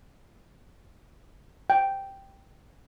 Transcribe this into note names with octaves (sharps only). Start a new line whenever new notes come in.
G5